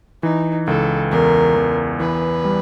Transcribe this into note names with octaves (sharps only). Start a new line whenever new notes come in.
E3 D#4
C#2 A4
E2 A#4
E2
E3 B4
G3